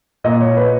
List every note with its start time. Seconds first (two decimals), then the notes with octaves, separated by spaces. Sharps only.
0.24 A#2 D#5
0.41 C#5
0.57 B4